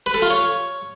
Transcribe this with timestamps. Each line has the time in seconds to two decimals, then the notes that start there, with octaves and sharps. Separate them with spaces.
0.06 B4
0.14 A4
0.22 F4
0.30 C#5